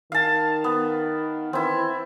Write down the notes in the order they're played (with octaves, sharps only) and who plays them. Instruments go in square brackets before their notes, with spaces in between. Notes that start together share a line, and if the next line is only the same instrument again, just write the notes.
[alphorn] D#3 [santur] F5 A5
[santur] B3
[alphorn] E3 [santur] C4 E4